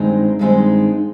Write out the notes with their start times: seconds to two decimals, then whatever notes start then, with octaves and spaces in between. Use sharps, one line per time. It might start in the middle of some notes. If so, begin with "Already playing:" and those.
Already playing: G2 D#3 G#3 C4 D#4
0.39 G2 D#3 G#3 C4 D#4